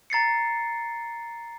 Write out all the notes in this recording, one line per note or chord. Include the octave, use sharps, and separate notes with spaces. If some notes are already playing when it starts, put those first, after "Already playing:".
A#5 A6 C7 C#7